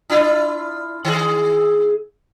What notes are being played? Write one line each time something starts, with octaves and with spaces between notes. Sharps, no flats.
D4 E4 F4
D#3 G#4